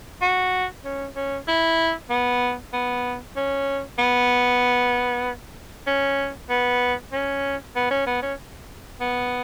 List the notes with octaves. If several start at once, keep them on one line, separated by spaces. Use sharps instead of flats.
F#4
C#4
C#4
E4
B3
B3
C#4
B3
C#4
B3
C#4
B3
C#4
B3
C#4
B3